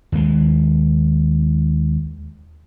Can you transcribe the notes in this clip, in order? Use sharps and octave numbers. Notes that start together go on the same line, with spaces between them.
D#2 G#3